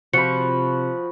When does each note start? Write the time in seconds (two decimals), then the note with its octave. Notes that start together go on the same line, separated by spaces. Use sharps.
0.14 C3 F3 F#4 B5 C#7